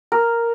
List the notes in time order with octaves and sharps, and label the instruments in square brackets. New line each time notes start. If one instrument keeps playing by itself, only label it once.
[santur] A#4